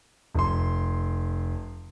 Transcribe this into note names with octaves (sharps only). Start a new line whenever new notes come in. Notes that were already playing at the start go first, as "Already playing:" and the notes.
F1 C6